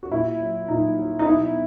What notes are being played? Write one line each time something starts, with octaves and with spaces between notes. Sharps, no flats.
F#4
A#2 E4
F#3
A#2 D#4
F#3
D#4
B2 E4